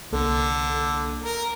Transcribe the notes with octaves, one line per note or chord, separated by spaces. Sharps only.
C2 D3 A#3 A4
A#4